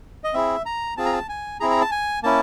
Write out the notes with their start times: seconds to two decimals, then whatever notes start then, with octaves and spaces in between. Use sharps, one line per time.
0.24 D#5
0.34 C4 E4 G#4 E5
0.66 A#5
0.97 C4 F4 G#4 A5
1.05 A#5
1.13 A5
1.29 G#5
1.60 C4 E4 G#4 A#5
1.70 A#5
1.81 A5
1.91 G#5
2.23 A#3 C#4 E4 A5